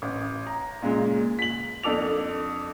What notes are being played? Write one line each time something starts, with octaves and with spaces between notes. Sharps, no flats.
A1
A#5
A#2 C#3 G#3
B6 F#7
F2 D4 A4 D6 F7